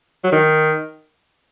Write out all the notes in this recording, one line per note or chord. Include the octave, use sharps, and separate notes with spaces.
F#3
D#3